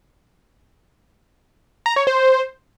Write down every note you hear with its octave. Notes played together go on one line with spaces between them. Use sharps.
A#5
C#5
C5